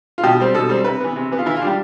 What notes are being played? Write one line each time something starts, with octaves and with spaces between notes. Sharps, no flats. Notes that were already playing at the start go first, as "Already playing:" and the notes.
F4
B2 G4
G3 C4
B2 A4
G3 C4
C3 B4
E3 B3
C3
E3 B3
F4
E3 E4
F4
G3 D4 G4